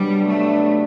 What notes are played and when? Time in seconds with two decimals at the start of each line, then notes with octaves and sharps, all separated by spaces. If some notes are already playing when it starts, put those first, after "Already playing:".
Already playing: C3 F#3 G3 B3 D4
0.26 A3